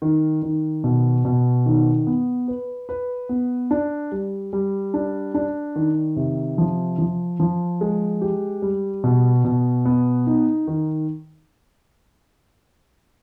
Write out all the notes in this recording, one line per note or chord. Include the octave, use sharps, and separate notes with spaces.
D#3
D#3
B2
B2
D#3
B3
B4
B4
B3
D4
G3
G3
D4
D4
D#3
C3
F3
F3
F3
G#3
G4
G3
B2
B2
B3
D#4
D#3